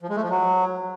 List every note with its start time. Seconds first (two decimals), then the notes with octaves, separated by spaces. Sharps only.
0.02 F3
0.09 G#3
0.16 A3
0.23 F3
0.30 F#3